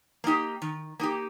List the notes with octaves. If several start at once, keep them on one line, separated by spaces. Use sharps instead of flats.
A#3 D#4 G4
D#3
A#3 D#4 G4